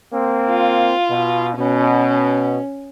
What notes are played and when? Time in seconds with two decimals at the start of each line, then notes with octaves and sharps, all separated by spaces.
0.13 A#3 C4
0.51 F4
1.10 B2
1.57 B2 C#4